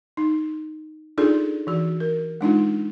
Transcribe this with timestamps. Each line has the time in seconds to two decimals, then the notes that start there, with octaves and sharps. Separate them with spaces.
0.17 D#4
1.18 D4 D#4 F4 G#4 A4 D5
1.67 E3 F#4
2.00 A#4
2.41 G#3 D4 D#4 F4